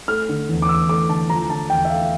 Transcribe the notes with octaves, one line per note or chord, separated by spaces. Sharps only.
A3 F6
D3
E2
D6
E2 E6
A3 D6
D3 A5
F3 A#5
D3 A5
E2 G5
E5
A3 F5